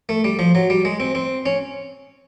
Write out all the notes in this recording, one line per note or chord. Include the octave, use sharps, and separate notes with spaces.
A3
G3
F3
F#3
G3
G#3
C4
C4
C#4